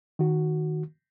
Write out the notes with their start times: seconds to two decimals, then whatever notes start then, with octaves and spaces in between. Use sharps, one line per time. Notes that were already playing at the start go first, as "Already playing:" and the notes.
0.19 D#3 F#4